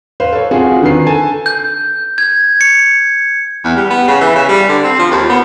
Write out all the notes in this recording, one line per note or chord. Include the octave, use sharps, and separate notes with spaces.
B4 C5 F5
A4 C#5
C4 F4 F#4 G#4
D3 D#3 B4 C7
A4 G#5 A5
G6
G#6
C#7
E2
G3
B3
C#3
E3
C#3
G3
D3
C4
F3
D#2
B3